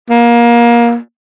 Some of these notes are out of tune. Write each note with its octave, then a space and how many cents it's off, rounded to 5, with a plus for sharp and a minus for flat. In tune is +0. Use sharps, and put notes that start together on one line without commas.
A#3 +25